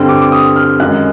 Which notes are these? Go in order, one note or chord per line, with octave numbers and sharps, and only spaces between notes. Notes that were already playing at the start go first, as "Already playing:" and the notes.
Already playing: G2 D3 G3 C4
D6
D6
D#6
F6
F#2 D#3 G#3 F#6